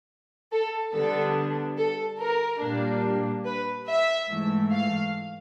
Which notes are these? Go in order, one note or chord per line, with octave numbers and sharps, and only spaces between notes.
A4
D3 G3 B3 D4 A4
A4
A#4
A#2 G3 A#3 D4
B4
E5
G#2 E3 A3
F5